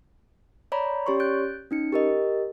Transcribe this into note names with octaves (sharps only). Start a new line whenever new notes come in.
C#5 D5 A#5 B5
C#4 G4 C#5 D5 C6 C#6
F#6 G6 A6 D7
C#4 D#4 C#7
G4 A#4 D#5